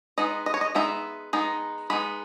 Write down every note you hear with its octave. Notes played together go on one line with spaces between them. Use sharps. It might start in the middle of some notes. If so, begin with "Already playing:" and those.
G#3 B3 D#4 D#5
D#5
C#5
D#5
G#3 B3 D#4 E5
G#3 B3 D#4
G#3 B3 D#4 B5